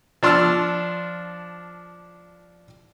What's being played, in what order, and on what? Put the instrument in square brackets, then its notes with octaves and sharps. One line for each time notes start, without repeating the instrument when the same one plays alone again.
[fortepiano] F3 D4 C6 E6 F6